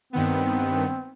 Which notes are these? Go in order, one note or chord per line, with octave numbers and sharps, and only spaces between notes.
G2 D#3 B3 C4